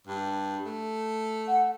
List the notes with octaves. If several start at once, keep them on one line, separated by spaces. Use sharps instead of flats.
G2
A3
F#5